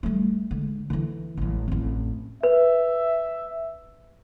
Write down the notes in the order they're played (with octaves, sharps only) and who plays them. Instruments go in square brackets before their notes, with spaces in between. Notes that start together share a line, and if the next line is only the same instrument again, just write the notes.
[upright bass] G3 A3
D3 G#3
D3 E3
A1 G#3
A1 F2
[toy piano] B4 [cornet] E5